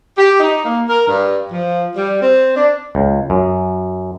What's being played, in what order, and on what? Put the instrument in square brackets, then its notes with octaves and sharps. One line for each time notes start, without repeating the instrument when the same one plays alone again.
[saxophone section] G4
D#4
A#3
A#4
G2
F3
G3
C4
D4
[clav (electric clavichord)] C#2
F#2